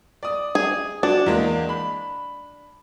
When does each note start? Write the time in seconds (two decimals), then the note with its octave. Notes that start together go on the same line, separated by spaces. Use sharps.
0.23 D5 D#6
0.55 G#4
1.03 D4 F#4
1.26 E2 G#3 A#3
1.69 B5